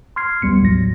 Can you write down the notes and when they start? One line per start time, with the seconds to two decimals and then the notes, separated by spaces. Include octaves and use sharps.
0.16 C6 F6 G#6 C7
0.42 D2 G3 B3 C#7
0.61 G#1 D#2 A2 F#3 A#6